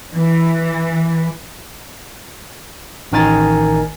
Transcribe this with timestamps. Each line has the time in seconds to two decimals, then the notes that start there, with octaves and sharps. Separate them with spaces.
0.13 E3
3.12 A1 D#3 A#4 G#5 A6